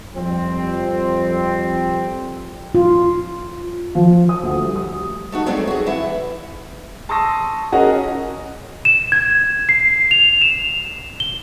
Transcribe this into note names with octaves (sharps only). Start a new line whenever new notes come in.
F2 G3 C4
F4
F3
D#6
D2
G3
D#6
A3 D#4 F#4
F#3 G#3 A3 C4 D5
F#4 G#4
E3 E4 F#5
A5 C6 C#6 D#6 E6 A#6
C#4 F#4 G#4 A#4 D#5 F#5
E7
G#6
C7
F7
E7
G7